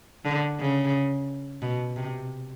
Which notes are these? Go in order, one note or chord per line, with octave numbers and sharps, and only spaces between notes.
D3
C#3
B2
C3